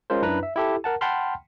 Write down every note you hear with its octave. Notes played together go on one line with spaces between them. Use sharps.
G#3 C#4 F4 A#4 C5
F#2 D4 E4 B4 A#5
E5
E4 G4 A4
A#4 F#5 A5
F#5 G5 A5 B5 C6 F6